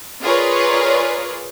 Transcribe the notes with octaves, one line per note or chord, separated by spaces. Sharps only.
F4 G#4 A#4 B4 C#5 D5